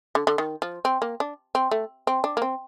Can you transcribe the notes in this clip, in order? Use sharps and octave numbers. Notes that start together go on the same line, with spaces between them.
D3
D3
D#3
F3
C4
A#3
D4
C4
A3
C4
D4
A#3
C4